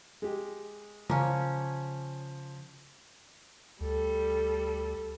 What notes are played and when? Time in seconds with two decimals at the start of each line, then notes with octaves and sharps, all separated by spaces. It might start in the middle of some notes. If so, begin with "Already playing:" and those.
0.22 G#3 G4
1.10 C#3 F3 A#3 C#4
3.80 D2 G3 A4